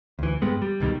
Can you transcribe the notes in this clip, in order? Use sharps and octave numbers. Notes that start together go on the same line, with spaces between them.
D2 E3
G2 G3 G#3 B3
G3
C#2 B2 D#3 G3